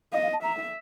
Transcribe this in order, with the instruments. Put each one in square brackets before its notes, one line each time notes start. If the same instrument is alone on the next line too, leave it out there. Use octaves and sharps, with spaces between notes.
[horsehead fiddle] D#5 [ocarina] F5
[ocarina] F5
A5
[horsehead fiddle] E5 [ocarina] A#5